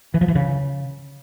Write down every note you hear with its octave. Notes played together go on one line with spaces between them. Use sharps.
E3
F3
E3
C#3